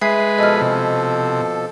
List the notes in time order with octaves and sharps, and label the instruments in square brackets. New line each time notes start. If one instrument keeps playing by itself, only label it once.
[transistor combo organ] G#3 B4 [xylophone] E5 G#5 C7
[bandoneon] B2 F3 A4 [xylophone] D#5 F6
[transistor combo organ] C3